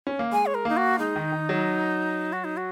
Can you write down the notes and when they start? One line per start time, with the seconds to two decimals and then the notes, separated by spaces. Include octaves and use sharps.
0.07 C#4
0.19 A#3
0.32 G#3 G#5
0.46 C#5
0.54 A#4
0.65 A#3 D#4
0.77 F#4
0.99 G#3 D#4
1.16 D#3
1.32 D#3
1.49 F#3
2.33 F#4
2.44 D#4
2.57 F#4